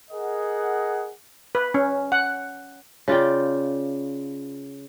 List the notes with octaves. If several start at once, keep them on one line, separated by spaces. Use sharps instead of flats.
G#4 A#4 D#5 F#5
B4
C#4
F#5
C#3 F4 D5 G5